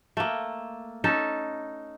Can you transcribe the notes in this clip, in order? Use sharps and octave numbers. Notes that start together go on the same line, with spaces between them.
A3 A#3
C#4 D#4 A4